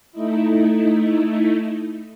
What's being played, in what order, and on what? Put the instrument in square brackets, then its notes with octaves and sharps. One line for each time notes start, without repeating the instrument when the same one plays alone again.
[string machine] A3 D#4 E4